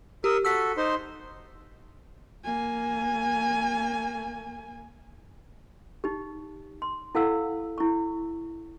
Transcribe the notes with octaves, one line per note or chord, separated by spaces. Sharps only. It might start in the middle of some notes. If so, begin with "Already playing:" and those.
G4 A#4 D#6 E6
F#4 A4 E6 B6
D#4 C5 C6
A#3 G#5
D#4 G4
C6
E4 A4 F5 F#5 E6
E4 C#6